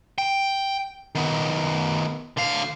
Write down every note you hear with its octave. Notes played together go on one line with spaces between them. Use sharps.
G5
D#3 B3
D3 F5